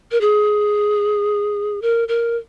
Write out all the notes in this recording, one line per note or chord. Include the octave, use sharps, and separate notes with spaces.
A#4
G#4
A#4
A#4